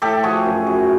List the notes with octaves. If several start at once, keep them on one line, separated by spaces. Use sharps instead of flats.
A2 G4 A4
F3 F#4 G#4
F#2
F#2